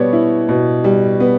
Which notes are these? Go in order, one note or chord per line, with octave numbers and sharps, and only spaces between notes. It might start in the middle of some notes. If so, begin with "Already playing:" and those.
Already playing: B2 G3 B3 C#5 D5
E4
B2
G3
B3